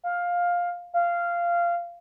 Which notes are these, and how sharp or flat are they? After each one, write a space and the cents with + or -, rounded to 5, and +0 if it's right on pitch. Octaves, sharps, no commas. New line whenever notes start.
F5 +10
F5 -15